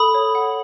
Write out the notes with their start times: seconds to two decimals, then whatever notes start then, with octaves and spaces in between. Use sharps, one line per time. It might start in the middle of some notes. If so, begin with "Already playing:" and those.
Already playing: A4 B5 D#6
0.14 C#5
0.35 F#5